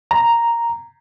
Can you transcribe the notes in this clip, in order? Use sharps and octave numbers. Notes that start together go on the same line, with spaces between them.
A#5